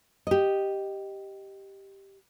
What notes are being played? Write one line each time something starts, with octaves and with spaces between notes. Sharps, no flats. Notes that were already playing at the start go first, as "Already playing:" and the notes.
G4 D#5